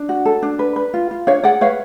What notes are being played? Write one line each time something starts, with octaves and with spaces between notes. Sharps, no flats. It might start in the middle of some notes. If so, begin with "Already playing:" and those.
Already playing: D4
F#4
A4
D4
B4
B4
F4
F4
D4 C#5 F5
G#4 D5 F#5
B4 C#5 F5